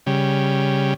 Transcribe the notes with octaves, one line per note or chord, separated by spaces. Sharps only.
C#3 G3